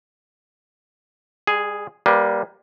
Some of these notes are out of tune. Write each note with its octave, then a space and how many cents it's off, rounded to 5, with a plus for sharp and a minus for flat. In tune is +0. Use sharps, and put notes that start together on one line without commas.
G3 +40 G#4 +0
G3 +0 A#3 +20 B4 +30